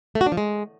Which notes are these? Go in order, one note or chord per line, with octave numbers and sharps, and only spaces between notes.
A3
F#4
D4
F3
G#3